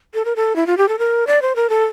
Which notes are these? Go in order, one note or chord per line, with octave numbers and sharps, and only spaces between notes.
A4
A#4
A4
E4
F4
G4
A4
A#4
D5
C5
A#4
A4